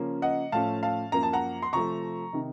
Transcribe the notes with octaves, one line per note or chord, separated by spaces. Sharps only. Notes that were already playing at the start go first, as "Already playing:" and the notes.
Already playing: C#3 F3 A#3 C#4
D#5 F#5
A2 F3 A3 C#4 F5 A5
F5 A5
F#2 F3 A#3 A#5
A5
F#5 A#5
C6
C3 F3 A3 A#5 C#6
C3 D#3